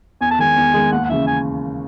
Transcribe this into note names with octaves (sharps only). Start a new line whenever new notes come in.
E2 G#5
A5
D#3 G#3 G#5
E2
D#3 G#3
D#2 F#5
F#5
C#3 E3 E5
G#5